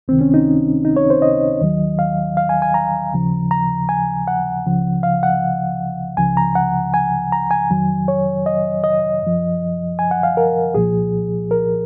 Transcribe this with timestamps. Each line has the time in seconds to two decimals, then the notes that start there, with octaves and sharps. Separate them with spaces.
0.08 C#2 C3 D#3 C4
0.21 C#4
0.34 D#4
0.85 D#4
0.96 C#5
1.10 C5
1.22 D#5
1.61 D#2 D#3 F#3
1.99 F5
2.37 F5
2.49 G#5
2.62 G#5
2.74 A#5
3.12 D#2 C#3 F3
3.51 A#5
3.89 G#5
4.28 F#5
4.65 C#2 C#3 F3
5.03 F5
5.23 F#5
6.17 C#2 C#3 F3 G#5
6.37 A#5
6.55 F#5
6.94 G#5
7.32 A#5
7.51 G#5
7.70 F2 D#3 F#3
8.08 C#5
8.46 D#5
8.84 D#5
9.23 F#2 F3
9.99 G#5
10.11 F#5
10.23 F5
10.37 A#4
10.75 C2 A#2 F3 G#4
11.51 A#4